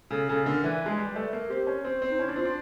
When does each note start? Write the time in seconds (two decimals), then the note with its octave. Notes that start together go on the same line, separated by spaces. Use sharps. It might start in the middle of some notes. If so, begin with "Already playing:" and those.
0.11 C#3 A4
0.29 C#3 A4
0.46 D3 A#4
0.63 E3 B4
0.86 G#3
0.98 G3
1.16 A3
1.33 A#3
1.49 C4 G4
1.67 C#4
1.85 C4
2.02 C4
2.11 D#4
2.19 C#4 E4
2.28 D4
2.36 C4 F4
2.45 D4